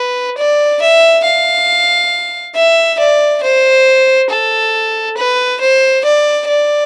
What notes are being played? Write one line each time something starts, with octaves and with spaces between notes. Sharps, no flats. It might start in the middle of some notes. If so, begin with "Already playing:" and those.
Already playing: B4
D5
E5
F5
E5
D5
C5
A4
B4
C5
D5
D5